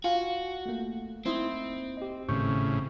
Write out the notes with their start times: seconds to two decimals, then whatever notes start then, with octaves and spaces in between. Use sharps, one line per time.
0.04 F4 F#4 F5 G#5
0.66 A3 A#3
1.25 C4 D#4 E4 C5
1.97 G4 D#5
2.29 G#1 A2 C#3 C#6 G6